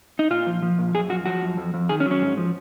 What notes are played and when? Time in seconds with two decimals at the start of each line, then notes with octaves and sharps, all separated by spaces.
0.19 D#4
0.30 A#2 F4
0.47 F3
0.62 F3
0.79 A#2
0.94 F#2 G#4
1.10 F3 F#4
1.26 F3 F#4
1.43 F#2
1.57 F2
1.74 F2
1.89 D#3 G#4
2.00 C#4
2.06 F#3
2.11 C#4
2.21 G#2
2.38 F3